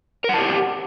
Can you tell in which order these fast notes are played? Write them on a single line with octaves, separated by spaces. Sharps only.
A#4 F#5 A5 G4